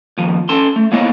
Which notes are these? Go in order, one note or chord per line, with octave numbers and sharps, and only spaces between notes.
D#2 F3
C#4 A4 A5 C6
A3
A#3 B3 E4 C#5 D#5